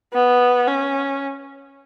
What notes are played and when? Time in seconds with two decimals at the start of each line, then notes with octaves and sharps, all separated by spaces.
0.13 B3
0.67 C#4